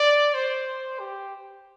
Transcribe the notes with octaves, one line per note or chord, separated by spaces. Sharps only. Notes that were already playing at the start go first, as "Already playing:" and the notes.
Already playing: D5
C5
G4